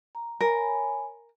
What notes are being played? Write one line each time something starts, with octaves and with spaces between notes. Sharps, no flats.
A#5
A#4 C#5 G#5 B5